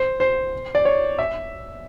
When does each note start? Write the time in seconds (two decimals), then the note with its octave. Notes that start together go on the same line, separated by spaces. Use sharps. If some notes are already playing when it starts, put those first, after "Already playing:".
Already playing: C5
0.20 C5
0.75 D5
0.85 C#5
1.19 E5